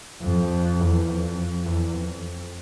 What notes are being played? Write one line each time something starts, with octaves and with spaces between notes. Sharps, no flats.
F2
E2
F2
E2
F2